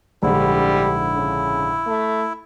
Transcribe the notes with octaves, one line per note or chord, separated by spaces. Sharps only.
A#1 G#2 D3 G3 E4
C#3
A3